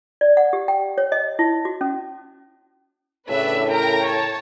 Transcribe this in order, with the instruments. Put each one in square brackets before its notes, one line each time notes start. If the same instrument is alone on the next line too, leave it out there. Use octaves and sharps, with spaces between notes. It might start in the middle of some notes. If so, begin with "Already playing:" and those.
[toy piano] D5
F#5
G4
G5
C#5
D#5
E4
F#4
C#4
[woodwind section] A2 C#3 [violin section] D4 B4 E5
[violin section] A#4 G5 A#5
C#5 A5